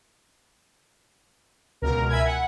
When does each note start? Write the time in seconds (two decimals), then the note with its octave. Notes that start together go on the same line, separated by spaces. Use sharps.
1.82 C#2 B2 A#4
2.08 E5 G#5 B5 G#6
2.25 F#5